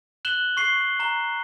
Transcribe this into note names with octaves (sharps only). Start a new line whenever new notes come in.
F#6 E7 F#7 G7
C#6 C7 G7
A#5 G7